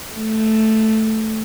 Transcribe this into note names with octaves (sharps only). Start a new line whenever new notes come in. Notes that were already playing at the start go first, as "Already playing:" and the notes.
A3